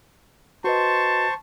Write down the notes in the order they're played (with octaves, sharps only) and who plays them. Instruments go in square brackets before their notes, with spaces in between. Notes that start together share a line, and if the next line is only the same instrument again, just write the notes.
[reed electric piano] F#4 B4 D#5 [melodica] C5 C6 C#6 [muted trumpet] A5